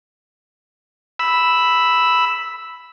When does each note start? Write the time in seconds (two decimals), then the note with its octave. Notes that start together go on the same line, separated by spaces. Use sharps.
1.19 B5 E6